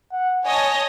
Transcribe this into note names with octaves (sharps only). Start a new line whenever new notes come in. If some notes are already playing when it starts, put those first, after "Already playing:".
F#5
C#5 D#5 G#5 A5